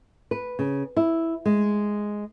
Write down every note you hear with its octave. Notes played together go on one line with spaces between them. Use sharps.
B4
C#3
E4
G#3